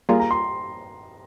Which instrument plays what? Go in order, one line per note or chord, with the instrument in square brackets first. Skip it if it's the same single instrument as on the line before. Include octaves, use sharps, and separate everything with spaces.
[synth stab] G3 A#3 F4 G#4 [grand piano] A#5
[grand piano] A#5
C6